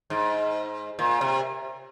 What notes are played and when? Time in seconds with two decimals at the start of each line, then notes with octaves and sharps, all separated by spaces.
0.10 G#2
0.99 A#2
1.21 C3